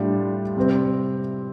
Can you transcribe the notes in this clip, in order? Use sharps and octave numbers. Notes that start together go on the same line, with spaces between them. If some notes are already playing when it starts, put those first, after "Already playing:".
Already playing: A2 G3 D4 F4
C3 G3 C4